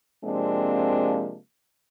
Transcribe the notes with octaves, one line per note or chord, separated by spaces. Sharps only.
C3 F3 G#3 A#3 C4 D4